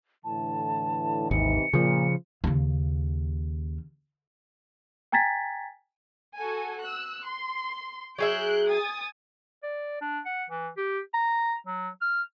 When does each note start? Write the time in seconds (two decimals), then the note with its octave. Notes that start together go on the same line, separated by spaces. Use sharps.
0.24 A2 D3 E3 A5
1.31 G#1 D#2 C3 E3 D#4 C#7
1.73 A#2 C#3 F3
2.44 D#2 C#3
5.12 G5 G#5 A#5 G#6 A6 B6
6.36 F#4 A4 G#5
6.80 E6 F#6
7.25 C6
8.18 F#3 G#4 E5 F#6 G6 D7
8.69 G#5 D#6 A6
9.63 D5
10.02 D4
10.26 F#5
10.50 E3
10.77 G4
11.14 A#5
11.67 F#3
12.01 F6